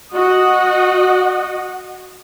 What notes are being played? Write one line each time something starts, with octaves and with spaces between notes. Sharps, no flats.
F#4 D#5 F#5